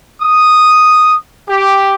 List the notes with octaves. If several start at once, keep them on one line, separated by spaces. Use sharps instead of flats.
D#6
G4